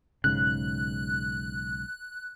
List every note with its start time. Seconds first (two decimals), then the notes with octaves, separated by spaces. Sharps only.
0.24 B1 G#2 C#3 F#6